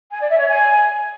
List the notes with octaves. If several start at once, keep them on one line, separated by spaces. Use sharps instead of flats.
G#5
D5
E5
C#5
G#5